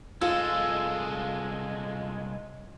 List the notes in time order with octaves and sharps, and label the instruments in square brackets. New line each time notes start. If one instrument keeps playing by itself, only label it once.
[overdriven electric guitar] C2 G#3 [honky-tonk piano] F4 [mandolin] A4